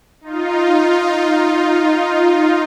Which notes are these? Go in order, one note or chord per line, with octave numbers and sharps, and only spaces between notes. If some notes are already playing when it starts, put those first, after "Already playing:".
D#4 F4